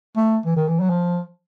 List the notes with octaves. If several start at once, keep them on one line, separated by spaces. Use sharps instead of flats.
A3
E3
D#3
E3
F#3
F3